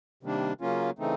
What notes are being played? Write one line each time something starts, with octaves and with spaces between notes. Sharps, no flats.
C3 D#3 G3 A#3 D4
C#3 F#3 A#3 C#4 F4
C#3 E3 A3 C4 D#4